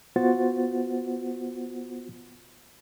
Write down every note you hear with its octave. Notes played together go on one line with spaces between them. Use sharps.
B3 F4 F#4 C5 F#5 A6